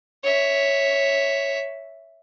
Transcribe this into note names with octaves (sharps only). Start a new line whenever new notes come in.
C#5 E5